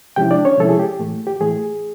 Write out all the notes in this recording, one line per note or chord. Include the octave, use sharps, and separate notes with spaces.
C3 F3 G#3 C#4 E4 G4 G5
D4 D5
C#4 C#5
C3 F3 G#3 C#4 E4 A4
G#4
G4
A2 E3 A3
G4
A2 E3 A3 G#4